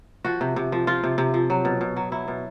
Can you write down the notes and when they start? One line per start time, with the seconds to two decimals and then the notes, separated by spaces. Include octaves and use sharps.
0.25 F3 F#4
0.41 C3
0.56 C3
0.72 F3
0.87 F3 F4
1.03 C3
1.18 C3
1.34 F3
1.50 F#3
1.65 B2
1.81 B2
1.96 F#3
2.12 F#3 E4
2.28 B2